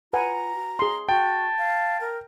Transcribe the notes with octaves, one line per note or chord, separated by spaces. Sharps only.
F4 B4 F#5 G#5 A#5
F#4
G#4 C6
F#4 G5 A5
F5
A#4